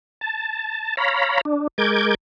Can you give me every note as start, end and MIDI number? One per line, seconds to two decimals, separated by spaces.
0.21 0.96 81
0.97 1.41 73
0.97 1.41 77
0.97 1.41 82
0.97 1.41 83
1.45 1.67 62
1.78 2.15 56
1.78 2.15 70
1.78 2.15 86
1.78 2.15 91
1.78 2.15 92